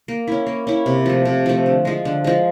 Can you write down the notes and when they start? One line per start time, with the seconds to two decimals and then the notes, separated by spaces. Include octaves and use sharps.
0.08 A#3
0.27 C#4 E4
0.46 A#3
0.67 C#4 E4
0.86 C3
1.06 F3 A3
1.25 C3
1.46 F3 A3
1.66 D3
1.85 F3 G#3
2.05 D3
2.24 F3 G#3